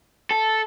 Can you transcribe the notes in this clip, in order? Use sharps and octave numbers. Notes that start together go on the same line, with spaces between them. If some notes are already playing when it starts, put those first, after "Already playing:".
A4